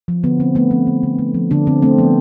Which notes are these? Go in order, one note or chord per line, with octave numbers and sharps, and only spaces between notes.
F3
D3 B3
D3 C4
A3 B3
F3 C4
D3
D3
A3
F3
D3 D4
D3 C4
A3 C4
F3 B3